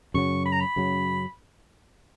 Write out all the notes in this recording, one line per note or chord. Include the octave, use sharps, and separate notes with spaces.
F#2 C#3 F#3 C#6
B5
A#5
B5
F#2 C#3 F#3